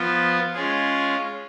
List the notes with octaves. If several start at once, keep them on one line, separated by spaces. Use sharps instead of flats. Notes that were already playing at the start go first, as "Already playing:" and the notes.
Already playing: F3 B3 F4
G#3 C#4 F4 G#4